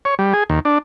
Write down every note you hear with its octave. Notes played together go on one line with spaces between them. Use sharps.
C#5
G3
G#4
D#2
D4